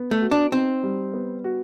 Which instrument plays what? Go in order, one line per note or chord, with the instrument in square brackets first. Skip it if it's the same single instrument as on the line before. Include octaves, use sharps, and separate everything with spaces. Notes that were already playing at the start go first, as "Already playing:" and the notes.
Already playing: [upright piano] B3
[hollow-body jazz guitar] A3
[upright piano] F#4
[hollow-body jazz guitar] D4
[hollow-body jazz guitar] C4 [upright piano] D#4
[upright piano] G3
B3
F#4